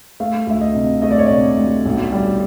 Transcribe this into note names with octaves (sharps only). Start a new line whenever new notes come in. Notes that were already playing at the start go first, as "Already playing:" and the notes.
A3 F5
D2 E5
D#5
C3
A3 D#5
D5
C#5
C3 D5
D2
B1
G3